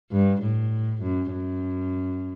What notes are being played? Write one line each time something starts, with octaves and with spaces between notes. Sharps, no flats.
G2
A2
F#2
F#2